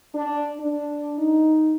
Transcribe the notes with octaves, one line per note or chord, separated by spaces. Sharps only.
D4
D4
D#4